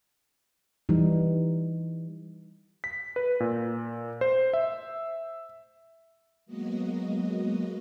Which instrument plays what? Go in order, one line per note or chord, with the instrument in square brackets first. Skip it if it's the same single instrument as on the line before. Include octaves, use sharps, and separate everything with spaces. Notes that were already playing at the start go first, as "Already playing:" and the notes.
[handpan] E3 G3 D#4
[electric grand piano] B6
B4
A#2
C5
E5
[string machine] F#3 G#3 A#3 B3 F#4 D#5